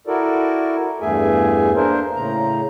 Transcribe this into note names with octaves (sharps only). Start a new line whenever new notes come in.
E4 F#4 A4 A#4 D5
E2 G2 A3 G#4 E5 G#5
A#3 D4 A#4 C5
A2 C#3 A#5